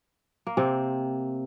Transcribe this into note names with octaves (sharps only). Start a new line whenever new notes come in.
A#3
C3 C4